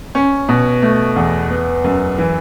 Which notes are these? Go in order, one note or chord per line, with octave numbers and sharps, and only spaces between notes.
C#4
B2
A3
E2
B3
F#2
E3